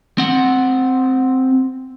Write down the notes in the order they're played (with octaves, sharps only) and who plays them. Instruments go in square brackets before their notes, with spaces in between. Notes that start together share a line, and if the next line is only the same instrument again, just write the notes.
[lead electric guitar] C4 F#5